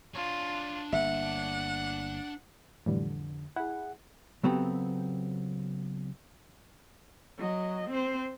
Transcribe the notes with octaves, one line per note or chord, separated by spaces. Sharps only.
D4 F4 C#5
G1 A#3 E5 F#5
F2 A2 D3 E3 G3
E4 G#4 F#5
C#3 F#3 B3 C4 G4 A4
F#3 D#5
C4 C5